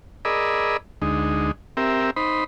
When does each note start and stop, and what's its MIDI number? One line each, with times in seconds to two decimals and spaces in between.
0.25 0.77 68
0.25 0.77 70
0.25 0.77 74
0.25 0.77 75
0.25 0.77 83
0.25 0.77 88
1.02 1.51 38
1.02 1.51 56
1.02 1.51 63
1.77 2.11 60
1.77 2.11 67
1.77 2.11 70
1.77 2.11 76
2.16 2.44 63
2.16 2.44 72
2.16 2.44 83